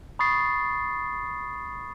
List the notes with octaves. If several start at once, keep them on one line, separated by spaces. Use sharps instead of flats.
B5 C#6 D#6 A6 C7